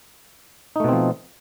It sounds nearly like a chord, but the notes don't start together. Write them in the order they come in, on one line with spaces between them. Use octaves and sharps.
D#4 A3 B2 C4 F3